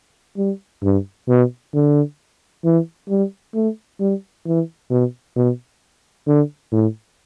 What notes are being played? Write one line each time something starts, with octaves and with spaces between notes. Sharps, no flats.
G3
G2
B2
D3
E3
G3
A3
G3
E3
B2
B2
D3
A2